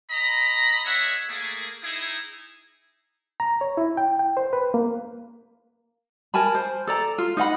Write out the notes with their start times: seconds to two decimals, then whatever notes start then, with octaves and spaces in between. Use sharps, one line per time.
0.11 D#5 A#5 B5
0.85 C#4 G#4 C#5 D#5 E5 F#5
1.29 A3 A#3 G#4
1.83 D#4 E4 G#4
3.40 A#5
3.61 C#5
3.77 E4
3.97 G5
4.19 G5
4.37 C5
4.53 B4
4.74 A#3
6.34 A#4 G#5 A5 B5
6.55 C5
6.87 A4 D5 A#5
7.18 F4
7.37 D#4 D#5 F#5 B5